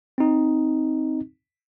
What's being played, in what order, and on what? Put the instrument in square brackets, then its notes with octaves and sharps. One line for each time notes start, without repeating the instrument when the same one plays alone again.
[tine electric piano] C4 D#4